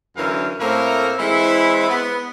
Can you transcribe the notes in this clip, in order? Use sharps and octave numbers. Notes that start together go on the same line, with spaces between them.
F#2 D3 E3 C#4 A#4 F5
A2 A3 A#3 C4 E4 A#4
E3 G#3 C4 E4
B3